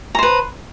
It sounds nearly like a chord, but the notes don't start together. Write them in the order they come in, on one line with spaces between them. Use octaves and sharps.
A#5 C5 B4